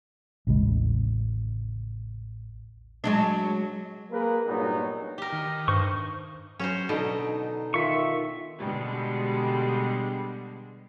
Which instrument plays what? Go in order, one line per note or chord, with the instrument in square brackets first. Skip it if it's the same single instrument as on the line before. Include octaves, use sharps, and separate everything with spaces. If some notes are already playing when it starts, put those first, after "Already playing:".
[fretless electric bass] A1 D#2 C#3 G#3
[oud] F#3 G#3 D4
[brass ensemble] A#3 G#4 A#4 B4
G2 A#2 F#3 B3 D#4
[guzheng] G4 A#4
[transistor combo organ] D#3
[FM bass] G2 [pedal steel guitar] C5 C#6
[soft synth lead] F#3 [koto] C#4 F#4 C5
[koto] B2 D3 D#5 [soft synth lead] D#4
[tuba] D#3 [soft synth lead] F4 [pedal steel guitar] E5 C#6
[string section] B2 D3 G3 G#3